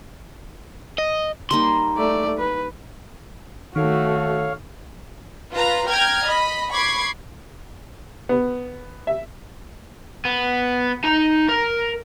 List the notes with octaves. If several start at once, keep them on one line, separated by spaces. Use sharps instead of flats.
D#5
G3 A#3 D#4 C6
A3 D5
B4
D#3 A3 F#4 A4 C#5 F5
F4 B4 A#5
G5 A#5 F6 G#6
D#5 B5
B5 C#6 D6 G#6 C7
B3
E5
B3
D#4 A#5
A#4